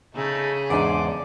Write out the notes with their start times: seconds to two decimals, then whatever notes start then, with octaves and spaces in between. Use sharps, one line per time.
0.15 C#3 A3 D#4 E4 G#4
0.70 E2 G#2 D4 C5 D5 D6